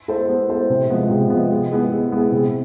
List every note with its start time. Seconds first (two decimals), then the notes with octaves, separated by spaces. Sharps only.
0.08 E4 A4 C5
0.28 B3
0.49 E4 A4 C5
0.70 C3
0.90 F3 G#3 B3
1.10 C3
1.30 F3 G#3 B3
1.51 G#3
1.72 B3 E4 G#4
1.91 G#3
2.12 B3 E4 G#4
2.32 C3